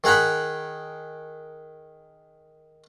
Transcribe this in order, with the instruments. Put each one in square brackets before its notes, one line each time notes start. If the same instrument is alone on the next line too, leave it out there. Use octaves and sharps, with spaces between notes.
[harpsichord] D#3 G#4 F#5 A#5 B5